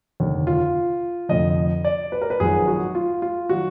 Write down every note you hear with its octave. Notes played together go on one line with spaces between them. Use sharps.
F1 D#2 D3
F4
F1 F2 D3 D#5
D5
B4
A#4
B4
G#1 F#2 F3 G#4
F#4
F4
F4
D#3 F#3 F#4